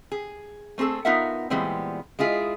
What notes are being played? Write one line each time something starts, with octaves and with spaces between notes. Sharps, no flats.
G#4
A3 C4 G#4 A4
B3 D#4 F4 A#4 E5 F#5
A#2 E3 G3 G#3 B3 C4
G#3 E4 F4 G#4